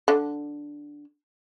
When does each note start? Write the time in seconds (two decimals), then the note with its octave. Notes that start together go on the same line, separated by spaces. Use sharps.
0.08 D3